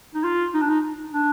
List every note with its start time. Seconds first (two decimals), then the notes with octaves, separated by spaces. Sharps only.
0.14 D#4
0.24 F4
0.54 D#4
0.61 D4
0.69 D#4
1.13 D4